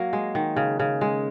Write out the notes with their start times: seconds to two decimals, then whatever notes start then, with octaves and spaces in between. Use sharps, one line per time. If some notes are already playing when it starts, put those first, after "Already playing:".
Already playing: F#3 A#3
0.13 G#3
0.35 D#3
0.57 C#3
0.80 C#3
1.01 G#3